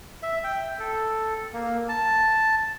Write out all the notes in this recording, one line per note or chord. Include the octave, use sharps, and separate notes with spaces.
E5
G5
A4
A#3
A5